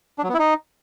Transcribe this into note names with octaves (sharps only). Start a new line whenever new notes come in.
D4
F#3
B3
E4
D#4